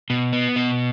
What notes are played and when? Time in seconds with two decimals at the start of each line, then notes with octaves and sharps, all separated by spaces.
0.10 B2
0.33 B3
0.56 B2